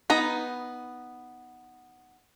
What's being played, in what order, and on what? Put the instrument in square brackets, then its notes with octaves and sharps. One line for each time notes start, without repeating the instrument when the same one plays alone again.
[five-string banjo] B3 D#4 A#5